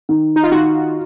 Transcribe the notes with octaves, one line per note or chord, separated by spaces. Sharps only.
D#3
D#4
F4
D#3 F#4